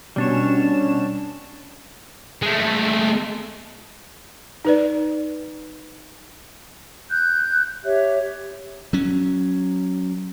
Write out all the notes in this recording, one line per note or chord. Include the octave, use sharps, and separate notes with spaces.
B2 G3 C#4 D4 C#5 E7
G#3 A3
D#4 B4 D5
F#6 G6
G4 C#5 E5
F#3 C#4